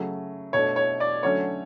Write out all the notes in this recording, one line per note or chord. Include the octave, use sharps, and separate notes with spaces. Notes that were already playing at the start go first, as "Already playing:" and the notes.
Already playing: C#3 F#3 A3
B2 A3 D4 C#5
C#5
D5
D3 F#3 A3 C#4 C#5